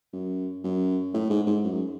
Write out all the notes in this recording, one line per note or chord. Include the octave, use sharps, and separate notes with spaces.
F#2
F#2
A2
G#2
G#2
F#2